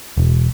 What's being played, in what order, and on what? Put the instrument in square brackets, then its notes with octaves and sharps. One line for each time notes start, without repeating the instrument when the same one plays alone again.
[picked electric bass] E1